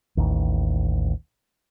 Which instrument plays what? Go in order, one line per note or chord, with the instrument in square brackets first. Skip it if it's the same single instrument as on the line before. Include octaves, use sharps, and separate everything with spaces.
[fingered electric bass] A1 D#2